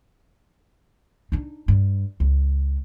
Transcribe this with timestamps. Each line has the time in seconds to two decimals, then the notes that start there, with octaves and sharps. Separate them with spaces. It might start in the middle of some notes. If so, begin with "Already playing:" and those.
1.32 D4 D#4
1.68 G2
2.20 C#2